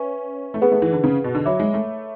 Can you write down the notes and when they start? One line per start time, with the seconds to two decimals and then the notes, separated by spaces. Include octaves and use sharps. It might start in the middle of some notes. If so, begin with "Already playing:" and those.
Already playing: C#4 B4 E5 G#5 C#6
0.54 A3
0.62 B3 G#4 B4 F#5
0.72 A3
0.82 E3
0.93 D3
1.04 C#3
1.24 B2
1.35 D3
1.45 F#3 C#5 E5 B5 D6
1.60 G#3
1.74 A3